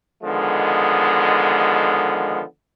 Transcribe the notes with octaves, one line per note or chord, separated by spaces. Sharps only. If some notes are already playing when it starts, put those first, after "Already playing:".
D3 D#3 F3 G#3 B3